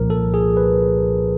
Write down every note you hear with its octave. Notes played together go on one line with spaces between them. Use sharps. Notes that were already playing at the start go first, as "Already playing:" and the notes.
Already playing: C2 A#2 F3 A#4
A4
G#4
B4